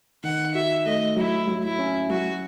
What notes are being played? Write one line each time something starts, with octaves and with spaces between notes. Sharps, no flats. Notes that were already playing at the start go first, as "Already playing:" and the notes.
D#3 F#5
F#4 E5
A3 D#5
F#3 E4
F#3
E4
C#4
F#3 F#4